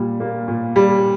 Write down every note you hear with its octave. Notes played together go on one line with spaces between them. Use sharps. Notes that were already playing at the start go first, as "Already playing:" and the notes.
Already playing: A#2 G3
A#3
A#2
G3